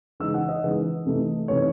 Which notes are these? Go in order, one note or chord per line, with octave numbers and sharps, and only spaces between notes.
C#3 E3 G#3 D#4 E6
F#5
D#5
C#3 E3 G#3 D#4
C3 E3 A3 D#4
C3 E3 A3 D#4 C#5